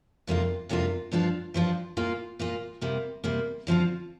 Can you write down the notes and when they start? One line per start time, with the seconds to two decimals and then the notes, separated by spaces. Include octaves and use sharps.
0.27 F2 C3 A#3 D4 F4
0.69 F2 C3 A#3 D4 F4
1.12 G2 F3 D4 F4
1.54 G2 F3 D4 F4
1.97 A#2 A#3 F4
2.39 A#2 A#3 F4
2.81 C3 G3 A#3
3.24 C3 G3 A#3
3.67 D3 F3 C4 F4